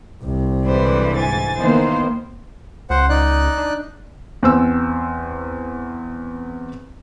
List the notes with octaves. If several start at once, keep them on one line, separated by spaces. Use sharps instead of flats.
C2 C3
D3 E3 G#3 B4 C5 D5
G#2 G#5 A6
D#3 E3 A#3 B3 C5
C#2 C5 F#5
D#4 D5 F#6
D4
E2 C4 E6